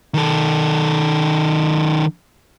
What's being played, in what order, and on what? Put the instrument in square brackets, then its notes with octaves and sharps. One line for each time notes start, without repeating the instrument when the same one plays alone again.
[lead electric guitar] D#3 A4